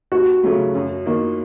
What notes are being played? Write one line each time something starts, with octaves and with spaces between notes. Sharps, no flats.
D#2 F#4
C#3 F#3 A3
F#2
D#3 A#3